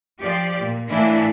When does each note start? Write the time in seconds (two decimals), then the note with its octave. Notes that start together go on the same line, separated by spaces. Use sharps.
0.20 F3 G4 D5
0.60 A#2
0.89 A2 E3 A#3 D4 E4